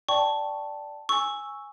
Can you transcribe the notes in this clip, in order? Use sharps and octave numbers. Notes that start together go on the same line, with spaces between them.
D5 G5 A5 C#6
G#5 C#6 E6